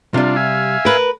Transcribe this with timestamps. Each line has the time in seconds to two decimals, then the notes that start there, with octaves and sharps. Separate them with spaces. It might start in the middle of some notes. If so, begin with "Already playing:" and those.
0.14 C3 G3 D4 F4
0.36 E5 F5 G#5
0.85 A#4 B4